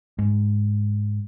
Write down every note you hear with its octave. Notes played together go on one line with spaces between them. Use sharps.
G#2